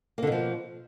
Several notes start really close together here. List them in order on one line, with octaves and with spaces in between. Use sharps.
A#3 D3 B2 F3